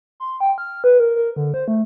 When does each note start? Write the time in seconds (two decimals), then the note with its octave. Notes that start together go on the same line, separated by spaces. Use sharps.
0.20 C6
0.40 G5
0.58 F6
0.84 B4
1.00 A#4
1.16 A#4
1.36 D3
1.54 C5
1.68 A3